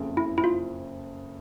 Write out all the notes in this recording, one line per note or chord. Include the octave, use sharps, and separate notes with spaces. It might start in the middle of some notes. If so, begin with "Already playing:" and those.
Already playing: F#1 F2 C#3
E4
E4
F4